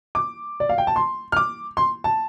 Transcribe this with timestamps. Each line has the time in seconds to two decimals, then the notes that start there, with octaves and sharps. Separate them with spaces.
0.15 D6
0.60 D5
0.69 F5
0.78 G5
0.87 A5
0.96 C6
1.32 F6
1.37 D6
1.77 C6
2.04 A5